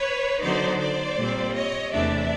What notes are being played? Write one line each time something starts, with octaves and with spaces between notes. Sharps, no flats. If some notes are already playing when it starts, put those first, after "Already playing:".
Already playing: B4 C#5
D3 F#3 B3 D#4 C5 D5
C5 D5
A#2 G3 C4
C#5 D#5
E2 C3 E3 A3 D4 D5 E5